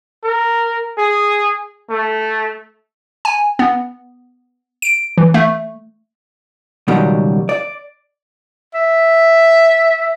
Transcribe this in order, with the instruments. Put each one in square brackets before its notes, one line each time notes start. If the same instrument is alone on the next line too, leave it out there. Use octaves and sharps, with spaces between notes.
[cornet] A#4
G#4
A3
[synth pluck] G#5
B3
D7
E3
A3
[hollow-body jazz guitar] C#2 B2 D#3 F#3 G3
D5
[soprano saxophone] E5